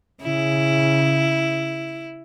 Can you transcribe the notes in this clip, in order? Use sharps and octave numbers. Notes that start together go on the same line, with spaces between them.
C#3 E4